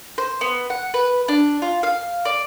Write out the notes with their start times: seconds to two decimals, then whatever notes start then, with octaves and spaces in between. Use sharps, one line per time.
0.18 C5
0.41 B3
0.70 F#5
0.94 B4
1.28 D4
1.62 F4
1.83 F5
2.25 D5